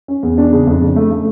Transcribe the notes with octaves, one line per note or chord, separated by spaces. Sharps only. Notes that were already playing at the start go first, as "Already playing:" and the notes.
C#4
E2
D4
C#3
F2
C#3
A3
A3